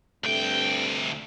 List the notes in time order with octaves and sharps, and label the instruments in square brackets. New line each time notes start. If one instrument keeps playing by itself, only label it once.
[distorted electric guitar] D2 G5 [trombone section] G2 C3 A3